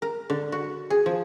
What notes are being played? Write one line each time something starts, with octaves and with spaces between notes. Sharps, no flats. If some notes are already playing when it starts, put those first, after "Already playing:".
A#4
D3
F#4
G#4
F3